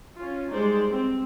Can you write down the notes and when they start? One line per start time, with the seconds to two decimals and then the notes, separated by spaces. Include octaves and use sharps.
0.18 C#4 F4
0.52 G3 G#3 D#4 C5 D5
0.90 C4